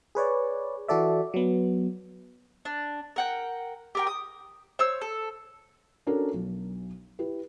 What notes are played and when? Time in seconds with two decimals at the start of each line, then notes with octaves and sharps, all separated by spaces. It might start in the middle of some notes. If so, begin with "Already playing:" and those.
0.15 G#4 B4 C#5 D5
0.88 E3 F#4 A4 D5 E5
1.34 F#3 B3
2.65 D4
3.16 A#4 F#5 G5
3.95 G4 A#4 G5
4.07 D#6
4.79 C5 C#5 E6
5.01 A4
6.07 C#4 D4 F#4 A4 A#4
6.34 B1
7.19 E4 G4 B4